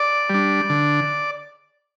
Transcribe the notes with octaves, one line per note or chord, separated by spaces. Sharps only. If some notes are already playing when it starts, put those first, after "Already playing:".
Already playing: D5
G3 D4
D3